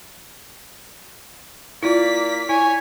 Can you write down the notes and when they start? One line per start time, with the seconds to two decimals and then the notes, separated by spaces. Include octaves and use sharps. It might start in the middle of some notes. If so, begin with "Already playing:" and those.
1.83 A#3 E4 F4 D5 B6
2.49 E4 C#5 G#5